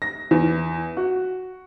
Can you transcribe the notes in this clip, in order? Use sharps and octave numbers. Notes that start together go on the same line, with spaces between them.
A#6
E2
F#4